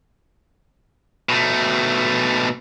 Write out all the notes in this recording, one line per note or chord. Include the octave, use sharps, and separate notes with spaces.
B2 A3